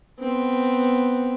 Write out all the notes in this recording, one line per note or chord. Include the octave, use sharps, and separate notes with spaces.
B3 C4